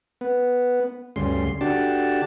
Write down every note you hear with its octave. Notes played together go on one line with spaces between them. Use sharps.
B3
D2 G2 C#3 C6
D3 D4 F#4 G4 A5